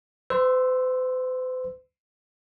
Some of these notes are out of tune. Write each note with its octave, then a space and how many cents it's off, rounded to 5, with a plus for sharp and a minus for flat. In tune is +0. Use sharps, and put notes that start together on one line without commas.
C5 -45 C6 +0 E6 +0